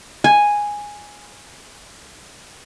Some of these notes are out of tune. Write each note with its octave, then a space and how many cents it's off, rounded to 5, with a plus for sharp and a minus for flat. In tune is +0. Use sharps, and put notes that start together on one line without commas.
G#5 -5